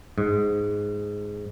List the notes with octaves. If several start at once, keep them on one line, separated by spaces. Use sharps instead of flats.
G#2